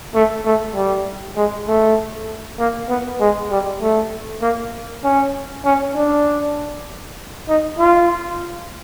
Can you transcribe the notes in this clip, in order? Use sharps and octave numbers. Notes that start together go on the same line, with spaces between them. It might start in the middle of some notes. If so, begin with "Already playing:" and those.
A3
A3
G3
G#3
A3
A#3
B3
G#3
G3
A3
A#3
C#4
C#4
D4
D#4
F4